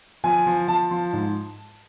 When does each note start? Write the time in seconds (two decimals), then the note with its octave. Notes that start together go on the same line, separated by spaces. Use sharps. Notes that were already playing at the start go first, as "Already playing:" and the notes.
0.24 F3 G#5
0.46 F3
0.68 F3 A5
0.91 F3
1.13 G#2